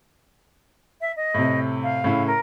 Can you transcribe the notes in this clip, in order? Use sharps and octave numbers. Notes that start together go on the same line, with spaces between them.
E5
D#5
A2 C3
F5
A2 C#3 E4
A#4